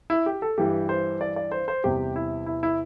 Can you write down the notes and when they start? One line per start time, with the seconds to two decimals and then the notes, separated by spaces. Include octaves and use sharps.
0.10 E4
0.26 G4
0.42 A4
0.57 G2 E3 G3 G4
0.89 C5
1.21 D5
1.36 D5
1.52 C5
1.68 C5
1.83 E2 C3 G3 G4
2.16 E4
2.46 E4
2.63 E4